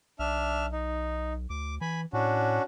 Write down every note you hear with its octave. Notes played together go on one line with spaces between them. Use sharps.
B1 D4 E5 F6
D#4
D2 D6
E3 G#5 B5
A2 C#4 D4 F#4